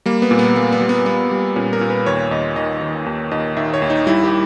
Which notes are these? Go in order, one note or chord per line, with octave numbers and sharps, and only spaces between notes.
G3 A#3
B3
A#2
B3
G3 A#3
B3
G3
B3
G3 B3
G3
A#2 C#4
A#4
A#2
B4
D#2 C#5
D#2 D#5
D#3 D#5
D#3
D#2
D#2 D#5
D#3 E5
C#5
D#2
D#4
G3 E4
G4